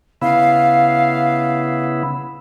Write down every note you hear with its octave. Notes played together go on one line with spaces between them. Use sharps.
C#3 B3 E4 F5